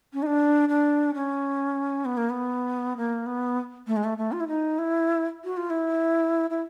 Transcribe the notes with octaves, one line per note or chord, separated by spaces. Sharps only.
C#4
D#4
D4
D4
C#4
B3
A#3
B3
A#3
B3
A3
G#3
A3
A3
F4
E4
D#4
E4
F#4
F4
E4
E4